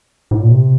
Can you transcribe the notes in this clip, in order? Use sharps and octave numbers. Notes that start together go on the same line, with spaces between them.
A2
A#2
C3